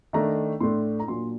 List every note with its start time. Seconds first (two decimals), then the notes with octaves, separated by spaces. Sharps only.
0.13 D#3 A3 D4 A#5
0.60 A2 A3 D4 C6
1.00 A#5
1.08 A#2 F#3 A#3 D4 C6